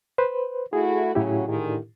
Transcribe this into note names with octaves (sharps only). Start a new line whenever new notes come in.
B4 C5
A3 E4 F#4 G#4
A2 C#3 F#3 E4 G4
D3 D#3 G#4